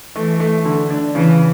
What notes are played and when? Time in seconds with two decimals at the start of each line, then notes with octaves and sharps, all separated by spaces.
0.16 E3 A3
0.40 A3
0.65 D3
0.90 D4
1.15 C#3 E3